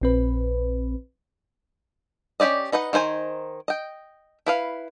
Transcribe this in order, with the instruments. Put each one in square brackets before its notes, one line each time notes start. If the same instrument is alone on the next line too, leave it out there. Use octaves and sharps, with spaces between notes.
[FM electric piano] A#1 C4 B4
[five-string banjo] C#4 E4 G4 D5 D#5
D#4 B4 D#5 F#5
D#3 D#4 C5 G#5
D#5 G5
E4 B4 F5